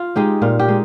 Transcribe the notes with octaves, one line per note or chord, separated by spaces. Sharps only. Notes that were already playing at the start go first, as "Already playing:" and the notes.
Already playing: F4
G#3 D#4 G4
A#2 F4
G4
G#3 D#4